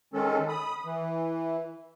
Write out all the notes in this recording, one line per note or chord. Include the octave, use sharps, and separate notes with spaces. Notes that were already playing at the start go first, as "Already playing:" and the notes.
D#3 G#3 C#4 A4
B5 D#6
E3